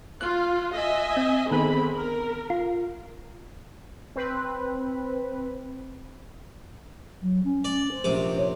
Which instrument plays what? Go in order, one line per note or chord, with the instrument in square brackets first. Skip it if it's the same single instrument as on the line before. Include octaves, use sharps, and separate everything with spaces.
[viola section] F4 [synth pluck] F#6
[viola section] D#5 E5 G#5
[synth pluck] C4
[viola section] D3 C4 B5 [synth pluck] D#3 B3 G#4
[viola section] A#4
[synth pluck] F4
[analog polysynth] C4 B4
[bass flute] F#3
C#4
[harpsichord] D5
[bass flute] C5
[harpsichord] A#1 C3 D6
[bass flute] C#5